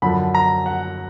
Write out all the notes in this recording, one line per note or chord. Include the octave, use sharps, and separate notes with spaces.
F#2 D3 F3 B5
A#5
F#5